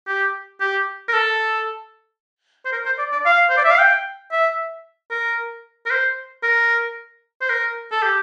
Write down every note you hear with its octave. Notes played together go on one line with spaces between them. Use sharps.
G4
G4
A#4
A4
C5
A#4
C5
D5
D5
F5
C5
D5
E5
F5
G5
E5
A#4
A#4
C5
A#4
C5
A#4
A4
G4